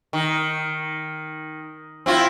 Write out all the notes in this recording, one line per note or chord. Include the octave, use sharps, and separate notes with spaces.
D#3
C4 E4 F4